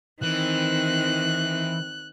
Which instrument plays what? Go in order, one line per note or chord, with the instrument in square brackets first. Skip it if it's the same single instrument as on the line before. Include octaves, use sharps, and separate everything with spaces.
[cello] D#3 C4 [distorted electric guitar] E3 [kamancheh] F#6